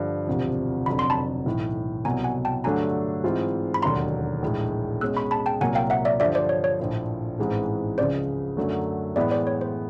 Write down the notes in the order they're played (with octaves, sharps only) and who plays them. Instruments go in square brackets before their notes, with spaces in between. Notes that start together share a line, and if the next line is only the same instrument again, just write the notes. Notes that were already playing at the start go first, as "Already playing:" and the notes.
Already playing: [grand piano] G2 D3 F3
E1 D2 C3 F3
[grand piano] F1 F2 D3 F#3 [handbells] B5
[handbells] C6
A5 B5
[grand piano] B1 A2 E3
[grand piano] C2 B2 F#3 [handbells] G#5 A#5
[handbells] F#5 G#5
G5 A5
[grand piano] G2 D3 F#3 A3 D4 [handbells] G#5 A#5
[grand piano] G#2 E3 G#3 C4 F4
[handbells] B5
[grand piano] E1 D#2 D3 F#3 [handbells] A#5 C6
[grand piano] A#1 A2 E3 G#3
[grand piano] B2 G#3 C#4 [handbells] E6 F#6
[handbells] B5 C#6
A5 B5
G5 A5
[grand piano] C2 A#2 F#3 A#3 [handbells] F#5 G#5
[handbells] F5 G5
E5 F#5
D5 E5
[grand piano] G2 D3 F3 [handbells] D5 E5
[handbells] C5 D5
C#5
C#5
[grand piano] A#1 A2 F3
A1 G#2 E3 G#3 C4
[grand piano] C#2 C#3 F3 G#3 [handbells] C5 D5
[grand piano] F#2 D3 F#3 A3
[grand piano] A2 E3 G#3 B3 [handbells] D5 E5
[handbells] C5 D5
C#5
C5